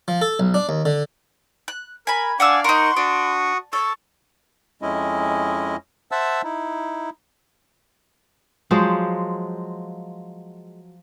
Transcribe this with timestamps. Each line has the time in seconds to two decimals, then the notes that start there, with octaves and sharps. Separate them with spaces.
0.08 F3
0.21 A4
0.40 B1
0.54 D4
0.69 D#2
0.85 D3
1.68 F#6
2.07 A#4 G#5 B5
2.40 D4 D5 F5 F#5 G#5 D6 E6
2.64 D#4 A#4 F#5 C6 C#6
2.96 D4 F#4 C#6 D#6
3.73 A4 C#6
4.82 F2 G#3 C#4 E4 D#5
6.12 C5 E5 F#5 A5 E6
6.44 D#4 E4
8.71 F3 F#3 G#3 C5